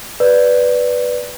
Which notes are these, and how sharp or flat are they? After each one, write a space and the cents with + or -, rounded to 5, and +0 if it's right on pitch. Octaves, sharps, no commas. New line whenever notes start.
B4 +0 D5 +0